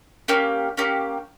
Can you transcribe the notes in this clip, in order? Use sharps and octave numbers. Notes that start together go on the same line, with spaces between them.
A#3 C#4 G4
A#3 C#4 G4